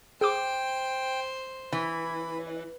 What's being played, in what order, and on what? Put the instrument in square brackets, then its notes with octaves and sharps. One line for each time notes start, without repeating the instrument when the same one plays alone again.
[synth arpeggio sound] G#4 D6 [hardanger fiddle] C5 [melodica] G5
[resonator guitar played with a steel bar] E3 [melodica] B5